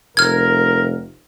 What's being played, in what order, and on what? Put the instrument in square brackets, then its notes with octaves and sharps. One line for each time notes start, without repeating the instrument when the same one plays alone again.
[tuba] F1 [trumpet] A#4 [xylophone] F6 G#6